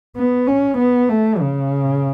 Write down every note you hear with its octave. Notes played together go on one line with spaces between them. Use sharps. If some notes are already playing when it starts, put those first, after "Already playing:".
B3
C#4
B3
A3
C#3